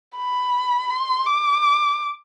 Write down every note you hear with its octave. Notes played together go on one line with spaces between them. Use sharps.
B5
C6
D6